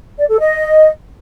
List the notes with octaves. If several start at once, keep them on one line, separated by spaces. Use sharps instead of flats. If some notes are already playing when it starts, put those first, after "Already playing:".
D5
A4
D#5